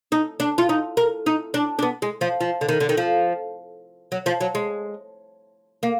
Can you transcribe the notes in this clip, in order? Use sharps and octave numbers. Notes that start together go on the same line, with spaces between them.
D#4
D4
F4
D#4
A#4
D#4
D4
D4
B3
G#3
F3
F3
D3
D#3
D3
D#3
F3
F#3
F3
F#3
G#3
A#3